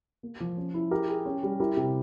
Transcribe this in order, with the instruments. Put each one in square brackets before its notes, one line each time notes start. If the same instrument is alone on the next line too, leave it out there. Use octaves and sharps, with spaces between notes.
[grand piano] A#3
F3
C#4
E4
[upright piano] G4 A#4 [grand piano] G#4
[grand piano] G#4
C#4
G3
[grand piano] E4 [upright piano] G4 A#4
[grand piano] C3